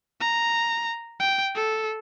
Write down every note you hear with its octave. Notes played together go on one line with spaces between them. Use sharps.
A#5
G5
A4